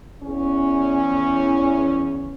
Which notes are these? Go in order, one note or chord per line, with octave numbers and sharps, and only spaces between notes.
E2 C#4